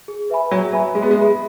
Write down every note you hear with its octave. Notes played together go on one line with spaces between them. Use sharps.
G#4
B4 E5 G#5 B5
F#3 G#4
F#3 B4 E5 G#5 B5
G#3 G#4
B3
G#3
E5 B5